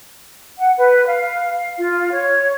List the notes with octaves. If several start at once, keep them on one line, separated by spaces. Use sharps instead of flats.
F#5
B4
F5
F4
C#5